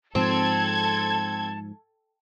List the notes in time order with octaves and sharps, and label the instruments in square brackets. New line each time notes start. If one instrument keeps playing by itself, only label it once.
[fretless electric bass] G#2 F3 [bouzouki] C4 [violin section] A4 G#6 [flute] A5